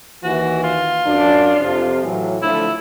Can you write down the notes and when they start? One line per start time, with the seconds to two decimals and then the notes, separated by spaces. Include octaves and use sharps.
0.24 D#2 E3 F#4
0.64 F4
1.05 F#2 D4
1.59 F2 C3 F3
2.03 A2 E3 F#3
2.42 D3 F3 A3 E4